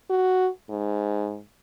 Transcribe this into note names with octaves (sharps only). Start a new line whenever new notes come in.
F#4
G#2